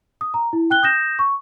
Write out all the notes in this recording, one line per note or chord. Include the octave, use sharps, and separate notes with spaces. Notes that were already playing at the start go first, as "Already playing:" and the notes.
D#6
A#5
E4
G5 F#6 G7
D#6 G6 A#6 E7
C#6